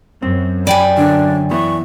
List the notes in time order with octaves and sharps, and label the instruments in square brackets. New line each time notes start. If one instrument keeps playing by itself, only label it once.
[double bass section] F#2 [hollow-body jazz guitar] C4
[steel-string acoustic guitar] D5 G5 G#5 [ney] B5
[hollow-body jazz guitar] D3 [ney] D4
[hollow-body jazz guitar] E3 B3 [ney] C#6